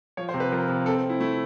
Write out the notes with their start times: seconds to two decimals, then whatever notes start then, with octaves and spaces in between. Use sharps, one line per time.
0.17 F3 C#5
0.29 C5
0.34 C3
0.40 B4
0.52 F3 A#4
0.68 C3
0.86 C4 A4
1.03 C4
1.10 E4
1.20 A3 E4